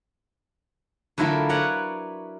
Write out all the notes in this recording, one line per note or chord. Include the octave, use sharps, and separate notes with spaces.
D3 F#3 A3 E4 F4 A#4
A#4 B4 C#5 D5 F#5